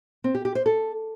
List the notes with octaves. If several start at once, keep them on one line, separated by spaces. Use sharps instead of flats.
C4
G4
G4
C5
A4